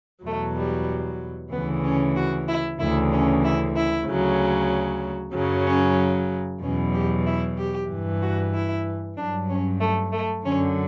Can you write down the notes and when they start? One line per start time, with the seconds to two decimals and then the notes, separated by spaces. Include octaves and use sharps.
0.25 E2 B2 F#3 A3
0.56 G3
1.52 D2 C#3 E3 B3
1.83 C#4
2.15 F#4
2.47 E4
2.79 D2 C#3 E3 E4
3.12 C#4
3.43 E4
3.76 E4
4.07 D2 C#3 F#3
5.34 F#2 C#3 F#3
5.66 C#4
6.62 E2 B2 F#3 C#4
6.93 G4
7.26 E4
7.57 G4
7.90 G2 E3
8.21 F#4
8.53 E4
9.16 G2 F#3 D4
9.48 C#4
9.80 A3
10.12 A3
10.44 F#2 D3 F#3 C#4